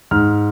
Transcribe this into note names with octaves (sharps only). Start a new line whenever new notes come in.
G#2 F6